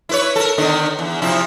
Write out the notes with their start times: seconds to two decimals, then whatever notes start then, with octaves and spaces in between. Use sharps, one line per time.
0.09 E4 B4 C#5
0.36 A4 A#4
0.58 D3 D#3 B3
0.99 E2
1.22 C3 F3 E4